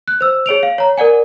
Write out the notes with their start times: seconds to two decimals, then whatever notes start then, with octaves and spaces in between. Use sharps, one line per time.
0.08 F#6
0.21 C5 E6
0.46 G#4 C#5 D7 F7
0.63 F5
0.78 C#5 A#5
0.97 A#4 D5 F#5 G#5